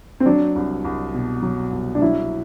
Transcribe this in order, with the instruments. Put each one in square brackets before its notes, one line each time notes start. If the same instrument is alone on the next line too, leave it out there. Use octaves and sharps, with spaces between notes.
[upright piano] C4
[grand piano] F#3 [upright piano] D4
[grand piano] C2
C2
B2
F#3
C2
[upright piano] D4
[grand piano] F#3 [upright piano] E4